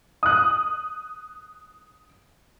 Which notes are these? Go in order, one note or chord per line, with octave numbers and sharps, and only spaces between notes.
D#6 F#6